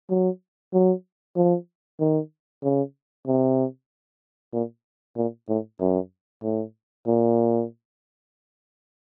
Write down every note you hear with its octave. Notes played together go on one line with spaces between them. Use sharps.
F#3
F#3
F3
D#3
C#3
C3
A#2
A#2
A2
F#2
A2
A#2